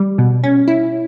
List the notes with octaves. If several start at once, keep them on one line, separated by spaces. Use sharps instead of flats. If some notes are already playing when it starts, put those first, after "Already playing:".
Already playing: G3
B2
C#4
E4